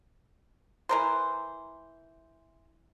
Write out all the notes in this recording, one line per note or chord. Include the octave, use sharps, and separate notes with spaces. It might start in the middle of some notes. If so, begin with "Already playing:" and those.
E3 A#4 C5